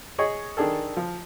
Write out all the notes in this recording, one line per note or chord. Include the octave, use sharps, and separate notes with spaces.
G#4 C#5 D#5 C#6
D#3 D4 G#4 A4
F3